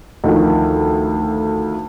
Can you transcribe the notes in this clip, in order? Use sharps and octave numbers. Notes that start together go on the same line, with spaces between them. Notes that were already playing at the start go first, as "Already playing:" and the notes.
D2 D#3 F3